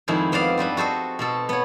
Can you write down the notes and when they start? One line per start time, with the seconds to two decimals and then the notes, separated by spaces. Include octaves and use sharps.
0.08 F2 D#3 G#3 C4 E4
0.32 B3 C4 B4 D5 F5
0.57 G2 G3 C4 B4
0.77 F#4 A4 C5 D#5
1.19 B2 C4 A4
1.49 B3 C#5